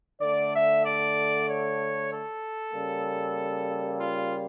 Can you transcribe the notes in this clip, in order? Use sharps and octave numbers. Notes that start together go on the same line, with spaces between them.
D3 A3 D5
E5
D5
C#5
A4
C#3 G3 A#3
F4